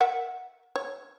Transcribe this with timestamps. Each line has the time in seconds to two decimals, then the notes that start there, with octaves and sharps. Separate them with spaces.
0.01 A#4 E5 F#5
0.76 C#5